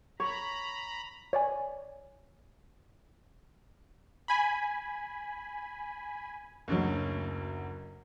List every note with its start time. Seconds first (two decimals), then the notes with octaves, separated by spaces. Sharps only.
0.20 C#5 A#5 B5
1.33 C#5 D5 G#5
4.28 G#5 B5
6.68 F#1 D2 F#3